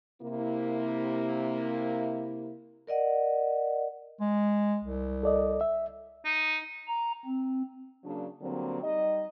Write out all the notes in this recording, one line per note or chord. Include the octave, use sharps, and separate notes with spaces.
C3 A#3 E4
A#4 D5 D#5 F#5
G#3
C2
A4 D5 D#5
E5
D#4
A#5
C4
C#3 F#3 A#3 D4
D3 F#3 G3 A#3 C4
G3 D#4 D#5